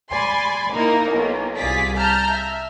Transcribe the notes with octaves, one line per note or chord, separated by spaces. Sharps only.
D5 G#5 B5 C6
A#3 D#4 E4 A#4
B1 A#3
C2 F4 G#4 D5 B6
A5 A#5 F6 G6
E5